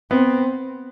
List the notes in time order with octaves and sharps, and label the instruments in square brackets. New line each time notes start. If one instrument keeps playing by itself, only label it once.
[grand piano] B3 [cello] C4